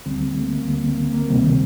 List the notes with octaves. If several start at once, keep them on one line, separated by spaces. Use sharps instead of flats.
D2 D3 G3 C4
A#3
A3
A#3
D2 D3 G3 A#3
C4
A#3
A#3
D2 C3 D#3 G3 C4